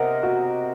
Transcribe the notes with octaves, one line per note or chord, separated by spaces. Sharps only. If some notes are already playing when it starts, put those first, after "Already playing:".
Already playing: C3 A#4 C5 D#5 F#5
F#4